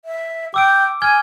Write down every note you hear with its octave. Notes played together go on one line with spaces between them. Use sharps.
E5
G5 D6 E6 D7
G#5 F6 G#6 G7